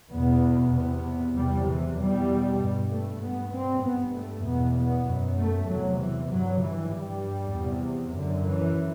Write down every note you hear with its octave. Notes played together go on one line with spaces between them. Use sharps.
E2 B2 B3
E2 C3 B3
E2 C3 G3
E3
E2 B2 G3
G2
A3
G2 B3
C4
G2 B3
A3
E2 B2 B3
B3
F#2
A3
E2 C3 F#3
E3
G2 F#3
E3
G2 G3
E2 C3
F#2 D3
E3